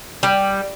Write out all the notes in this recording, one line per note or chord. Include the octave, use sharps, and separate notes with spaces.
G3